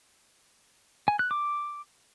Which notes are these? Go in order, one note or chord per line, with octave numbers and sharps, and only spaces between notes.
G#5
F#6
D6